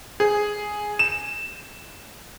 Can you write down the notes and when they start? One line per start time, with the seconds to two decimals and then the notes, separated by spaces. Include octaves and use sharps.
0.20 G#4
0.99 E7